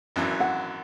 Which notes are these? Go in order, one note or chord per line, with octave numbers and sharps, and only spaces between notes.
G#1 F#2 E3
F#5